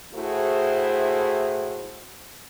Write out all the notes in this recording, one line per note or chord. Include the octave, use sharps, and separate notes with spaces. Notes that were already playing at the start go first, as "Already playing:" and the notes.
A2 A3 E4 F#4 G#4 C5